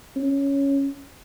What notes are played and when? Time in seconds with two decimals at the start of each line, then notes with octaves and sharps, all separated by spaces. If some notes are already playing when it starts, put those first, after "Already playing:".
0.16 C#4